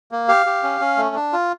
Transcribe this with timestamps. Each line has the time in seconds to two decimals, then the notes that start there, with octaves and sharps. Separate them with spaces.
0.11 A#3
0.28 G4 F5
0.46 G4
0.63 C#4
0.80 C#4
0.97 A3
1.16 D4
1.33 F4